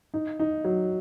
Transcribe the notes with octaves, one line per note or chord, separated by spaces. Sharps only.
D#4
D#4
F#3